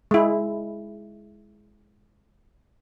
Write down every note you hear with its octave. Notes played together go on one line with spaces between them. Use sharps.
G#3 E4